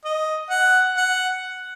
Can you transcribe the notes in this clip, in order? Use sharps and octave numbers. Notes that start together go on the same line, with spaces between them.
D#5
F#5
F#5